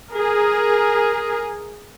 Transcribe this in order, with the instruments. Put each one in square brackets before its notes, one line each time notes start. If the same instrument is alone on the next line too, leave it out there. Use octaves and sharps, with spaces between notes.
[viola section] G#4 A#4